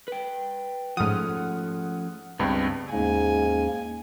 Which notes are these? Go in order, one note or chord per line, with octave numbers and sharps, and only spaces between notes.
B4 G5
G#2 F3 A3 C#4 F#5 D#6 F6
C#2 G2 B3 C4
D#2 G#2 A#3 C#4 G#5